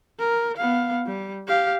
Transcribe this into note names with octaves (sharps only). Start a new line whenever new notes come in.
A#4
B3 F5
G3
G4 F5